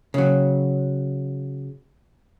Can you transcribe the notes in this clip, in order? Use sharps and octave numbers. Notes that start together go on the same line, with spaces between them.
C#3 F#3